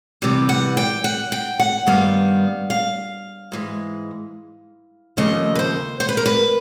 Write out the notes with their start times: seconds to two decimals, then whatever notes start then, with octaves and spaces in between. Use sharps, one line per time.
0.22 C3 E3 G3 B3
0.49 F#5
0.77 G5
1.04 F#5
1.32 G5
1.59 F#5
1.86 G2 D#3 G3 B3 F5
2.70 F5
3.52 G#2 E3 G#3
5.17 D#2 C#3 F3 A3 D#5
5.55 B4
5.59 C5
6.00 C5
6.09 B4
6.17 A#4
6.26 B4